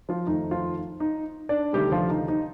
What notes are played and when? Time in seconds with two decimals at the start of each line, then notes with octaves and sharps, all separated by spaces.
0.09 F3 F4
0.27 F2 D#3 A3 D#4
0.51 F3 F4
1.00 D#4
1.49 D4 D5
1.73 D2 C3 D#3 G3 A3 C4 G4
1.92 F3 F4
2.10 D#4
2.28 D#4